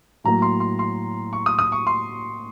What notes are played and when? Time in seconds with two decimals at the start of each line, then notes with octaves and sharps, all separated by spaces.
0.24 A2 F#3 A#3 A#5
0.42 C6
0.60 C6
0.79 C6
1.33 C#6
1.46 D#6
1.59 D#6
1.72 C#6
1.87 C6